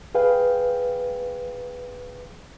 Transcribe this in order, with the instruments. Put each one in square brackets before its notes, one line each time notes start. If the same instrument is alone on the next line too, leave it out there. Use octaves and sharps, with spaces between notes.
[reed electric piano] G#4 B4 F5 G5